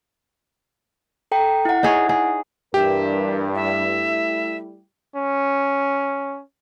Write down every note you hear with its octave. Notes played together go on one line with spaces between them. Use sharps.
A4 G5 A#5
E4 F#5
D#4 G#4 C#5
G#4
G2 E3 G4 A#4 E5
G3 A3 E4 E5
C#4